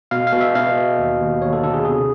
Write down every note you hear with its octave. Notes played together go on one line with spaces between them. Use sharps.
B2 F5
F5
B2
E5
B2 F5
B2
D#2
D#2
D#2 C#5
A4
D3 A4
G#4
C3 G#4